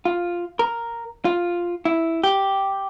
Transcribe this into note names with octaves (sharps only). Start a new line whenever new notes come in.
F4
A#4
F4
E4
G4